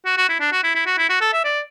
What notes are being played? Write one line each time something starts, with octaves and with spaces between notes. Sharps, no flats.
F#4
F#4
E4
D4
F#4
E4
E4
F#4
E4
F#4
A4
E5
D5